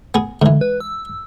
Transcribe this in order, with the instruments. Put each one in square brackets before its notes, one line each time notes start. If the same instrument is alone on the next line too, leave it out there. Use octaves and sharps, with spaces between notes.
[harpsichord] B3 G#4
[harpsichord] G#2 E3 [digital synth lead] D3
[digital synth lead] B4
E6